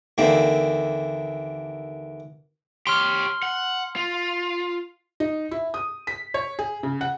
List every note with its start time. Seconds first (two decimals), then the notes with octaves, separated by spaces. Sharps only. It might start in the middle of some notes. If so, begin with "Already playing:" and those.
0.18 D#2 D3 E3 A#3 C4
2.87 G4 C#5 C6 F6
3.43 F#5
3.96 F4
5.20 D#4
5.51 E4
5.74 D#6
6.07 B6
6.34 C#5
6.59 G#4
6.83 C#3
7.01 F#5